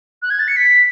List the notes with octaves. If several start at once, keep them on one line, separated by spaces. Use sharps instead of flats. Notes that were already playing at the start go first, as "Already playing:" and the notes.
F#6
G#6
A6
C#7
B6